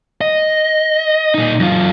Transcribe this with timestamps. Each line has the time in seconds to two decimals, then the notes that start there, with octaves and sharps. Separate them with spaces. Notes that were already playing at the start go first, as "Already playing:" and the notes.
0.21 D#5
1.34 A#2 D#4
1.60 F#2 F4